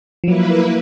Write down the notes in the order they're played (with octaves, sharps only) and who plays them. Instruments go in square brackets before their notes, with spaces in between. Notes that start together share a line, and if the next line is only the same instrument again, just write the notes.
[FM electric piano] F3 F#3 [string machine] A#3 E4 B4